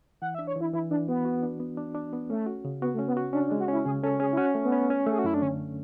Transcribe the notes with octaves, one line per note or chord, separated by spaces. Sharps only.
E3 F#5
E5
D4
C#5
E3 E4
E3 E4
E3 D4
B3 F#4
F#4
D4
B3
D4
D4
B3
A3 C#4
F#4
C#3
B3 F#4
A3
C#4
B3
F#4
C#4 D4
D4
G#3
F#4
C#4 E4
C#3 G#4
C#4 A4
C#4 G#4
E4
C#4 F#4
A3
B3
C#4
C#4
A3 G#4
F#4
F#2 E4
D4
D3 C#4